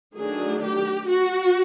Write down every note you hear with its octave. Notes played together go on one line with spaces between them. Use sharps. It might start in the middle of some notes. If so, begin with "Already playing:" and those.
D#3 F#3 A3 D4 G#4
G4
F#4